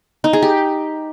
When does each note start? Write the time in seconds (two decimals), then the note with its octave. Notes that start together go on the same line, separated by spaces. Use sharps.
0.24 D#4
0.33 G#4
0.42 G4